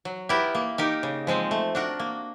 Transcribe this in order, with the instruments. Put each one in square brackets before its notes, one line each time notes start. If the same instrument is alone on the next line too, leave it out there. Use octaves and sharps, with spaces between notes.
[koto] F#3
B3 E4 G4 A#4
A#3
D#4 G4 A#4
C#3
F3 G#3 C4
A3
D4 F#4 A#4
A#3